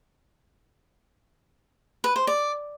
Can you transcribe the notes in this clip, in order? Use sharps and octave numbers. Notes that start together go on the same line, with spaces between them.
B4
C5
D5